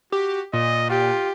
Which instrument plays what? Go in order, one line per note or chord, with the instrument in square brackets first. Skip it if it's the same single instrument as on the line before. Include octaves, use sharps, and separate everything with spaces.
[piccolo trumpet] F#4 [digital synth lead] G4
[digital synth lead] A#2 [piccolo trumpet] D#5
[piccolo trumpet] F4 [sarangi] G4